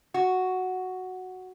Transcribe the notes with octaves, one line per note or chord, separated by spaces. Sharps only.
F#4